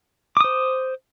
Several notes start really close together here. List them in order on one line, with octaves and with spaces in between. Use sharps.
D6 D#6 C5